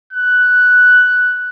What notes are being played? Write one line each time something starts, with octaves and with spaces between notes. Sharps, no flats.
F#6